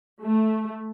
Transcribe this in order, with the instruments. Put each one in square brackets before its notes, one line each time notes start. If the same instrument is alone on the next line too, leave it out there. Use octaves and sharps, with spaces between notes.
[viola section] A3